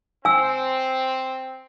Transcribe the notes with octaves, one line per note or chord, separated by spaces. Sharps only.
C4 G#5 E6